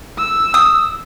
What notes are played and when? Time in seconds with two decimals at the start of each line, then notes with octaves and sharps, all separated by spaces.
0.18 E6
0.54 D#6